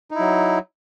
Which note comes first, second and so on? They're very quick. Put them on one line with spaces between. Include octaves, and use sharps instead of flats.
D#4 E4 F#3